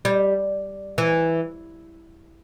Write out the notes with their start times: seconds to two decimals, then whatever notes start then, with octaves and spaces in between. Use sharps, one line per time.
0.05 G3
0.98 E3